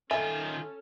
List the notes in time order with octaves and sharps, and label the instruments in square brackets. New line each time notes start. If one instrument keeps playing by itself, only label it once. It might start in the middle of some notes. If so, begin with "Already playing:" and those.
[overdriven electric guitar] D#3 F4 [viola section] C#4 A4 [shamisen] E5 [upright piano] G#5